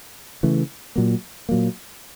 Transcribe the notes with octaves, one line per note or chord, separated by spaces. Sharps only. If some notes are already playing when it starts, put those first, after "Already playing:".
C#3 E3 A3
A#2 F#3 A#3
A#2 F#3 A#3